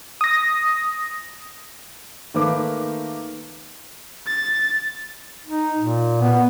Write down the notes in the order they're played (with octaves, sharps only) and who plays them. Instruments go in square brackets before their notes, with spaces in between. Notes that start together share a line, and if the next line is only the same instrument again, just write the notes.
[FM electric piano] D#6 A#6
[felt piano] D#3 A3 A#3 B4 D6
[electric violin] A6
[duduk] D#4
A#2
B3